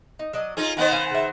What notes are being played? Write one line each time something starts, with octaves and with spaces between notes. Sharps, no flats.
D#4
F#3 D4 D#5
C#4 D#4 F4 G#4 A4
D#3 B3 C5 D#5 F#5 G#5
C#4 F5 G#5
C#3 E5